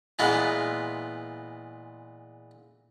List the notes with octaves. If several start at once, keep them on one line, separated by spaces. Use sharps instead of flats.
A#2 E3 G#3 B3 F4